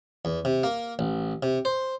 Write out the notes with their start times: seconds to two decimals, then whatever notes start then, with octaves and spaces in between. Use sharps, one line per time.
0.25 E2
0.45 C3
0.63 A#3
0.99 A1
1.43 C3
1.65 C5